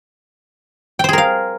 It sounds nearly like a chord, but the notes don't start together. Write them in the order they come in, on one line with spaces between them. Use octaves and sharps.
G5 C5 G#4 A#4 F5